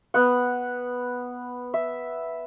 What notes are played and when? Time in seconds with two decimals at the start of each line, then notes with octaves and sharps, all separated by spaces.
0.14 B3 F#5
1.74 E5